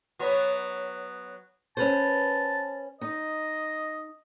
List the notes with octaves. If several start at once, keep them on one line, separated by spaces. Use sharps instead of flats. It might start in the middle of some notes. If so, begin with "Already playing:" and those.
F#3 B3 C#5
C#4 B4 C5 A5
D#4 D#5